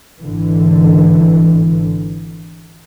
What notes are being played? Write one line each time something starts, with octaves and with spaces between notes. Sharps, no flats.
G#1 D3 E3